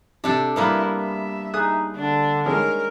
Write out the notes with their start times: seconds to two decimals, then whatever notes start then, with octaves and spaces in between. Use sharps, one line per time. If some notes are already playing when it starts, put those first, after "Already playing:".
0.24 C3 D4 G4 A4
0.56 G3 A#3 B3 E4
0.95 E5
1.54 D#4 G#4 D#6 F#6
1.96 D3 D4
2.46 D#3 G#3 C#4 A#4